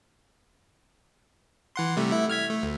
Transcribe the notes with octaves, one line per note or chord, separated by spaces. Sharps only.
E3 F#5 C6
C3 G3 A3
A3 E4 E5
F6 G#6 B6
A3
D2